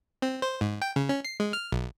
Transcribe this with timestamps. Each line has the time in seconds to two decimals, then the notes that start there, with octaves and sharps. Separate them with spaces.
0.22 C4
0.42 C5
0.61 G#2
0.82 G5
0.96 C#3
1.09 C#4
1.25 C7
1.40 G#3
1.53 F6
1.72 B1